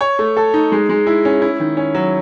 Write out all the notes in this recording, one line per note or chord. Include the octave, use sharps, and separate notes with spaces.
C#5
A3
A4
D#4
G#3
G#3
E4
C#4
E4
D#3
C#4
F#3